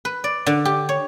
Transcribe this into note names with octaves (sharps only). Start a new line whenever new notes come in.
B4
D5
D3
G4
C#5